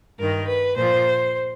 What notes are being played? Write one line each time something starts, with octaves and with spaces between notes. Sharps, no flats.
G2 D#3 A#4
B4
A#2 F3 C5